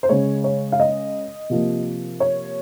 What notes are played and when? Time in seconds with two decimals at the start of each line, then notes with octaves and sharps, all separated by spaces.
0.03 C5
0.09 C#3 G#3 C#5
0.44 C#5
0.72 F5
0.80 D#5
1.50 C3 F3 A#3
2.20 C#5